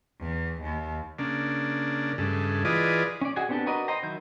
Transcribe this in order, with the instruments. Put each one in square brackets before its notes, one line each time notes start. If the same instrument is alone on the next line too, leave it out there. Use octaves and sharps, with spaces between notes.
[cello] E2
D#2
[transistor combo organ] C#3 A#3 D4
G2 C#3 G#3 A3
E3 F4 G#4 B4 D5 D#5
[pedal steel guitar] C#4 D5
F#4 G#4 D#5 F#5 G#5
B3 C4 D4 G4 A4
F#4 A#4 B4 D5 D#5
C5 D#5 G5 A#5
D#3 F#3 E4 G6